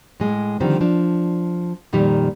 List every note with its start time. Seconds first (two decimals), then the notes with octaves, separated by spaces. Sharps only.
0.20 A2 G#3
0.60 D3 D#3 F3 G3 C4
0.81 F3 D4
1.93 F2 A#2 D#3 G3